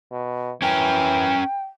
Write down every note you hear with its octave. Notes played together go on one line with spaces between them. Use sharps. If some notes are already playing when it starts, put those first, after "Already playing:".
B2
E3 C#4 A#4 G5